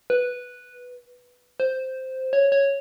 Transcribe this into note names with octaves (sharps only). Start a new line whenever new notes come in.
B4
C5
C#5
C#5